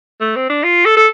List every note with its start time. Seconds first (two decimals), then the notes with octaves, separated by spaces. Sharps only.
0.21 A3
0.36 C4
0.50 D4
0.63 F4
0.86 A4
0.97 A4